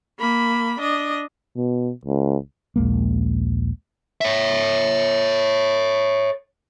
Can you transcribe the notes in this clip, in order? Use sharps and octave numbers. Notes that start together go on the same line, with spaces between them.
A#3 B5
D4 D#5
B2
C#2
A#1 D#2 G#3 A#3
C#5 E5